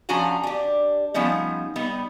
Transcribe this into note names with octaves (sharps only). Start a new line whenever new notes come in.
F3 C#4 D4 F#4 G#5 A#5
D4 G4
F3 G3 B3 C#4 D#4
G3 B3 D#4